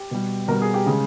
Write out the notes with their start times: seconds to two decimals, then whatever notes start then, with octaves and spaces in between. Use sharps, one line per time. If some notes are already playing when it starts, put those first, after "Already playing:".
Already playing: G4
0.11 B2 G3
0.48 B2 G3 A#4
0.62 G#4
0.74 G4
0.86 C#3 G#3 G#4